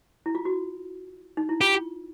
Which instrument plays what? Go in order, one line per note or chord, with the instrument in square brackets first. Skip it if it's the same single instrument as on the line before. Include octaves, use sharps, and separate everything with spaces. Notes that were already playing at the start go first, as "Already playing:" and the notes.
[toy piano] E4
F4
F#4
D#4
E4
[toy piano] F4 [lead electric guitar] G4